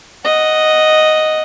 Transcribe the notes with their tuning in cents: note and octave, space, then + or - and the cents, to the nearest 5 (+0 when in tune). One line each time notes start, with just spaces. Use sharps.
D#5 +0 F#5 +0